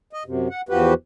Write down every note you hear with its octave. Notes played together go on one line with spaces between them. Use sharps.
D#5
F#2 C3
F#5
E2 F3 F#4 G4 B4